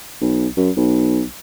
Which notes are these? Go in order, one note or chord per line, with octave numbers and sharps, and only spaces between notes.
B1
F#2
B1